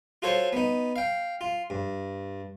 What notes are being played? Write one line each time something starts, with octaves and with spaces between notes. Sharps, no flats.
F4 F#4 A4 C5 C#5
B3 D#4
F5 G5
F4
G2